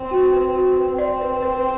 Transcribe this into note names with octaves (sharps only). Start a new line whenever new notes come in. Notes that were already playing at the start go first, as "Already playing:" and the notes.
Already playing: C4
F#4
B4
F#4
B4
C4 D5
B4
B4